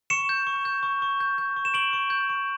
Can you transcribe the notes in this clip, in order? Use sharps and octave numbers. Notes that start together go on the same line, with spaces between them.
C#6 C#7 E7
G6
C#6
G6
C#6
C#6
G6
G6
C#6
E7
C#6 D7 F#7
C#6
G6
C#6